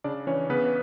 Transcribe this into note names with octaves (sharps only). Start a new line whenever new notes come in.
C#3 D4 D5
E3 C#4 C#5
C#3 B3 B4